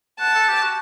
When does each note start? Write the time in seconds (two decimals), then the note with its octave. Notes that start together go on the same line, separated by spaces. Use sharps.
0.20 F#5 A5
0.35 A4
0.49 G4
0.62 F#4